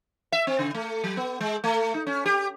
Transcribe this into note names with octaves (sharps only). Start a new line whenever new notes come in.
E5
C4
C#3
A3
F#3
B3
G#3
A3
D#4
C#4
G4